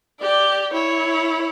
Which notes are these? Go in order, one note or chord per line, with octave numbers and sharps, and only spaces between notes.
G4 D5
E4 C#5